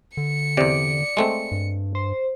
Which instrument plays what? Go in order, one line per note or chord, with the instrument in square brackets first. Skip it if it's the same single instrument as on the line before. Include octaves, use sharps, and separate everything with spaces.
[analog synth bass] D3 [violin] C#7
[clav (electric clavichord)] E2 C3 [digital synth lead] D5
[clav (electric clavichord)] G#3 A3 C4
[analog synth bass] G2
[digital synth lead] C5